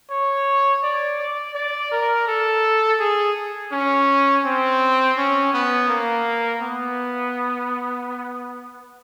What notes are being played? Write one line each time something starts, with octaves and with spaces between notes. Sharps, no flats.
C#5
D5
D5
D5
A#4
A4
G#4
C#4
C4
C#4
B3
A#3
B3